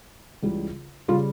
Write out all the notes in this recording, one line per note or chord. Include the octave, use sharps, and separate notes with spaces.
C#2 C#3 E3 G3
C#3 G3 F4